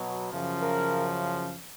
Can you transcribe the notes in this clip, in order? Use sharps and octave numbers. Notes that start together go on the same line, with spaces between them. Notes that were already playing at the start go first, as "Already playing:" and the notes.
Already playing: B2 F#3
F#2 C#3 F3
A#4